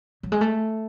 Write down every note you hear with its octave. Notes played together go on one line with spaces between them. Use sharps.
F#3
G#3
A3